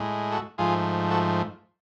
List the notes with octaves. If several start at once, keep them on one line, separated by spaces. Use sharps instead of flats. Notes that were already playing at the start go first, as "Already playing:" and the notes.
Already playing: A2 G#3
F#4 A4
G#2 F3 A3 F4 G#4
F#4 A4